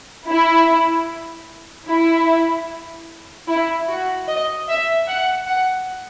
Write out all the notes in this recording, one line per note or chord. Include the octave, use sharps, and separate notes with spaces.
E4
E4
E4
F#4
D#5
E5
F#5
F#5